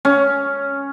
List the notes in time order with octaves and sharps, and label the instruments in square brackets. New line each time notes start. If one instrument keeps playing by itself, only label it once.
[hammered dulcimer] C#4